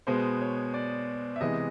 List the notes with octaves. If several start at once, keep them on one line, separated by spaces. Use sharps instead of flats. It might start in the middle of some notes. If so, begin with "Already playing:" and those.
B2 G#3 B3 C5
C#5
D5
E5
C3 E3 G#3 B3 D#5